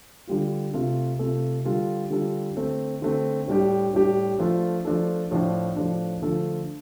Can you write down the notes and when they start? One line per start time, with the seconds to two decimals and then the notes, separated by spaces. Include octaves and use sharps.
0.28 D3 G3 F4
0.74 C3 A3 F4 A4
1.19 C3 A3 F4 A4
1.65 D3 G3 F4 A4
2.11 D3 G3 F4 A4
2.57 D3 A3 C4
3.02 D3 A3 C4
3.48 A2 G3 D4 G4
3.94 A2 G3 D4 G4
4.39 F3 A3 D4 F4 A4
4.85 F3 A3 D4 F4 A4
5.31 A2 F3 A3 D4
5.76 A2 F3 A3 D4
6.22 D3 F3 A3 F4 A4